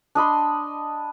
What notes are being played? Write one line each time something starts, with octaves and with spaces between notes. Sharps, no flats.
D4 D#5 B5 C6